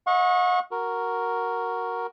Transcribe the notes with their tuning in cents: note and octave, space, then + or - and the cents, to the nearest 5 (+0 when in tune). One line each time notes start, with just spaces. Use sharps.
D#5 +30 F#5 -40 C#6 -20
F#4 +0 A#4 +0